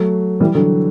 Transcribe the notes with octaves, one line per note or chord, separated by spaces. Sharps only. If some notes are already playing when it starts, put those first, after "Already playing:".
Already playing: F#3 A3
E3 G3
D3 F#3